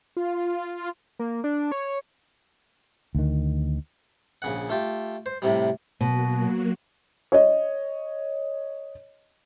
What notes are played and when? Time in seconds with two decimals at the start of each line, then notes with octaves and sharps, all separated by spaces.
0.17 F4
1.19 A#3
1.44 D4
1.72 C#5
3.15 D2 D#3
4.42 A#1 C#3 F#5
4.69 A3 F4 G4
5.26 C5
5.42 A2 C3 G3
6.01 B2 F#3 A#3 F#4
7.32 C#5 D#5